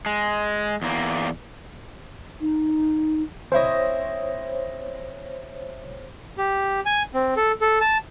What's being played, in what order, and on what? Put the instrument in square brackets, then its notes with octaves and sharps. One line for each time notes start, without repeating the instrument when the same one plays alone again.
[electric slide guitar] G#3
E2 A#3
[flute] D#4
[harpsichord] C4 E4 D#5 [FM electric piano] C5 C#5
[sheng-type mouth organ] G4
G#5
C4
A4
A4
A5